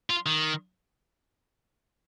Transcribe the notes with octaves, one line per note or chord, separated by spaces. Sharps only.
F4
D#3